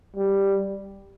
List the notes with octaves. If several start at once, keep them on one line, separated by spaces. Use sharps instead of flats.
G3